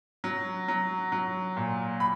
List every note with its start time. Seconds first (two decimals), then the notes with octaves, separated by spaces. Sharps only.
0.24 F#3
0.68 F#3
1.12 F#3
1.57 A#2
2.00 B5